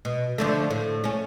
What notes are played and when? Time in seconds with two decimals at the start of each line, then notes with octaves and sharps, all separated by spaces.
0.05 B2
0.38 D3 F3 A3
0.70 A2
1.04 A3 C#4